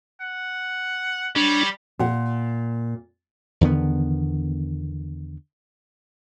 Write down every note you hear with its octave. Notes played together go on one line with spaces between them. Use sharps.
F#5
G3 D4 C#5
A#2 F#5
E2 D3 D#3 B3